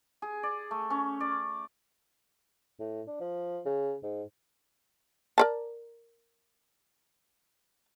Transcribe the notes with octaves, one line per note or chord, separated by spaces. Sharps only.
G#4
D5
A3
C#4
D5
A2
D4
F3
C#3
G#2
A#4 D5 A5